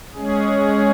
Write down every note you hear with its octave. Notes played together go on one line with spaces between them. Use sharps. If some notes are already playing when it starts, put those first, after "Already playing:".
G#3 C#4 G#4